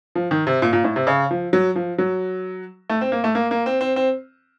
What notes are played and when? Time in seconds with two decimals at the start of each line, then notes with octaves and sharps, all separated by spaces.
0.15 F3
0.31 D#3
0.47 C3
0.62 A#2
0.73 A#2
0.84 A2
0.96 C3
1.07 C#3
1.31 F3
1.53 F#3
1.76 F3
1.98 F#3
2.90 A3
3.01 C4
3.12 A#3
3.24 A3
3.35 A#3
3.51 A#3
3.66 C4
3.81 C4
3.96 C4